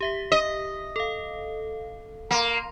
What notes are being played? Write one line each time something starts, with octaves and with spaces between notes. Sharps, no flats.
G4 E5 B6
D#5
A4 F5
A#3 A#5 C6